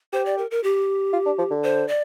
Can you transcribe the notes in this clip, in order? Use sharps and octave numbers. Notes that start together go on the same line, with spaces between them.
G4 C5
D5
A#4
A#4
G4
F4
D4
F3
D3
C5
D5